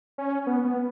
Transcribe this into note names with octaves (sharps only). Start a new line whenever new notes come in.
C#4
B3
B3